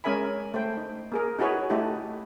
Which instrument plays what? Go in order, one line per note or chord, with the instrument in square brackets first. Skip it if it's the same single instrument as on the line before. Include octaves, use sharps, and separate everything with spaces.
[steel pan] G#3 C#4 A#4 E5 G#5 B5
A3 C5 G5
D#4
A#3 G#4 A#4
D#4 E4 F#4 G#4 B4 C#5
A3 D#4 E4 G4 A4